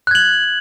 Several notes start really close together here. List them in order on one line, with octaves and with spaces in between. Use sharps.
F#6 G#6 F#7